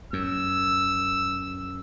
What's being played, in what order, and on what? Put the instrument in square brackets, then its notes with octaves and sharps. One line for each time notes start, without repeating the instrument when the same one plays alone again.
[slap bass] F#2 [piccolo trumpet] E6